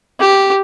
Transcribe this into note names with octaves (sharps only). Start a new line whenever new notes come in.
G4